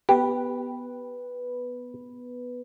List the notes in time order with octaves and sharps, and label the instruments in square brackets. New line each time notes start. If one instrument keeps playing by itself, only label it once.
[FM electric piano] B3 B4 [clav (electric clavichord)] G4